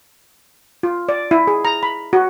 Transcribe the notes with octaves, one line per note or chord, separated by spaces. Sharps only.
F4
D5
E4
G#4
A#5
B5
F#4